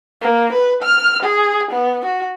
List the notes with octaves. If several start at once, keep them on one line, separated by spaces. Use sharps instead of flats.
A#3
B4
F6
G#4
B3
F#4